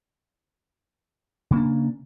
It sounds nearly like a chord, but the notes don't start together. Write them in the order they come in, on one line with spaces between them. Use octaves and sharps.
C#3 A#3 D4